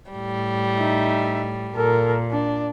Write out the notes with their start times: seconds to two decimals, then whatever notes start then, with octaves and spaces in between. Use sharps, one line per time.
0.11 A2 G3
0.77 D#4 E5
1.75 A#2 A4 A#4
2.31 D4